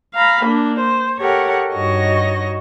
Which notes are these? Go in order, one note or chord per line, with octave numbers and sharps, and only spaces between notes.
F5 A#5 B5
A#3 D4
C5
G4 A4 A#4 C#5 F#5
G2 D#4 F#4 C#5 D#5 A#6